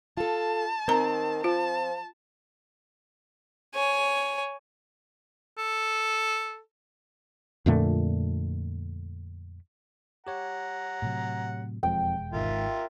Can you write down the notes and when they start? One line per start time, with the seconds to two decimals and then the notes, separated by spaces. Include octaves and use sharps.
0.17 F4 A4 A5
0.88 D#3 C4 A#4 A#5
1.44 F3 F4 A5
3.75 C#5 G#5
5.58 A4
7.66 F2 A#2 D3 A3
10.27 G4 C#5 F#5 A#5
11.02 A2 C3 F#3
11.83 E1 F2 F3 G#3 G5
12.33 G#1 G#2 F4 A#4 E5